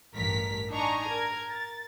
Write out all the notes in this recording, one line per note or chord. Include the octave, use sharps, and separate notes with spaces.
A1 G2 A#4 B6
D4 D#4 G#5 A#5 C#6
A#4 G#6
A6